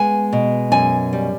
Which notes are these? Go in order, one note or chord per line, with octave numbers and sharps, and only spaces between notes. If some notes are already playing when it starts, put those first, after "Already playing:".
Already playing: G#3 B3 G#5
B2
F#2 G#5
G3